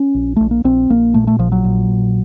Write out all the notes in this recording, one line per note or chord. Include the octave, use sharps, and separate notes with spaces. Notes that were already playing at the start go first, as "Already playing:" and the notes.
Already playing: C#4
A#1
A#1 A3
A#3
A#1 C4
A#1 A#3
A#2 A3
A3
A#1 F3
F#3
A#2
A#1